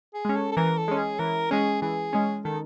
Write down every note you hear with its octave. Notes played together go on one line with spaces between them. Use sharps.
G#4
G#3 C#4
A4
A4
E3 A#4
A4
G#3 C#4
G#4
E3 A#4
G#3 C#4 G#4
E3 G#4
G#3 C#4
D#3 A4